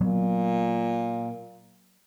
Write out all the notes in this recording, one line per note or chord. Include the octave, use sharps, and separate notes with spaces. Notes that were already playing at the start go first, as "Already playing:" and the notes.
A#2 F#3 B3